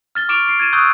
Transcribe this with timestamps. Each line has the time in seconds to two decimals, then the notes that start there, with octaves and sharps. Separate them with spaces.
0.15 F6 A6 G7
0.29 C#6 D6 F6 D7 E7 F7
0.48 C7 D7
0.60 G#6 A6 D#7 E7
0.73 C#6 D#6 E6 F#6 G6